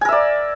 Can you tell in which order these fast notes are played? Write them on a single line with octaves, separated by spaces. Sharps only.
G#5 A#4 E5 D5